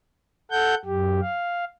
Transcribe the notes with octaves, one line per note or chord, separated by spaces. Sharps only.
A4 F#5 G6
F#2 G4
F5